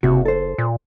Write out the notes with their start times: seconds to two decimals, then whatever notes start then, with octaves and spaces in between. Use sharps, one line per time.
0.03 F#1 C3 F#4
0.25 A4 C5
0.58 A#2